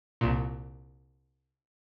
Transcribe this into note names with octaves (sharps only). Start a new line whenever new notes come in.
C2 A#2